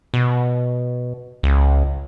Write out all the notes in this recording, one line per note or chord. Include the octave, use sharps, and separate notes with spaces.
B2
C#2